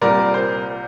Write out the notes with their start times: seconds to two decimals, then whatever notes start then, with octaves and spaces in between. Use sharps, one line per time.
0.02 C2 A#2 G3 A#4 D5
0.34 C5